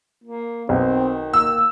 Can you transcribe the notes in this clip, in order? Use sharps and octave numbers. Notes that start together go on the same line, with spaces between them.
A#3
B1 D#3 C4
A#3 E6